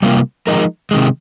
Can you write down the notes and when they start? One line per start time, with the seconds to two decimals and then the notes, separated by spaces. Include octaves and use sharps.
0.02 C3 G3 A#3 F4
0.47 F3 G#3 D#4 A#4
0.91 C3 D#3 G#3